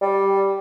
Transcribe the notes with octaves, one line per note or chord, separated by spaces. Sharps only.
G3